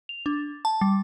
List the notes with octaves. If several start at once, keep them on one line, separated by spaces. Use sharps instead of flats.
F7
D4
A5
G3